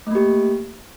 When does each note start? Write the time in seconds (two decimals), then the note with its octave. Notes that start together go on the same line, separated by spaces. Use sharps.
0.07 A3
0.11 A#3
0.15 G4